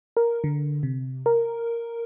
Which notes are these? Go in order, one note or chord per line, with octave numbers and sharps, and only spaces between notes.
A#4
D3
C3
A#4